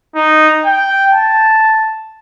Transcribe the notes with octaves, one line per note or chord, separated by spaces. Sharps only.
D#4
G5
A5